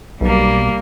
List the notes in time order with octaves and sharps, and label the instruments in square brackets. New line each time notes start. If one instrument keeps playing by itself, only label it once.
[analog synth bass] B1 [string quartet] G3 A#3